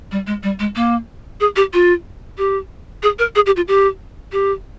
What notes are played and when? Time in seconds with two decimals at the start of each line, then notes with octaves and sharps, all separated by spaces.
0.12 G3
0.27 G#3
0.43 G3
0.59 G#3
0.76 A#3
1.40 G#4
1.56 G4
1.73 F4
2.38 G4
3.03 G#4
3.19 A#4
3.35 G#4
3.46 G4
3.56 F4
3.68 G4
4.32 G4